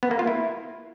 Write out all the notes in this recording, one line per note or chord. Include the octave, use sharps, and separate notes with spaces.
B3
A#3
F4
E4